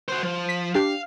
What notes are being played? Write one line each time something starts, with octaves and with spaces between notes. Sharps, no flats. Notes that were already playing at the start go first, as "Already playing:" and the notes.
F#4 C5
F3
B6
D4 G4 F5